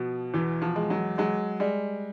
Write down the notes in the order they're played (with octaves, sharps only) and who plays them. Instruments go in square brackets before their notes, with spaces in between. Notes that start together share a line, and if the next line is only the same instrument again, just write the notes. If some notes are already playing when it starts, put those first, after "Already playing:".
Already playing: [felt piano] B2 [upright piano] F3
[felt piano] E2 [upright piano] E3
[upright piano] F3
[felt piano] G#3
[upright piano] F#3
[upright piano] F#3 [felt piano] G#3
[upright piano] G3 [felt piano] G#3